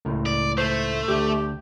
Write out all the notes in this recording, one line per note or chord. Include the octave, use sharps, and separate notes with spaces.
C#2 A2 A#4
D5
A3 C5
D2 G4